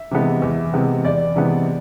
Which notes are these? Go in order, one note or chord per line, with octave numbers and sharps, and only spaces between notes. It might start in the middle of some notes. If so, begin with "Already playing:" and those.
Already playing: E5
C3 E3 G#3 B3
E2
C3 E3 G#3 B3
E2 D5
C3 E3 G#3 B3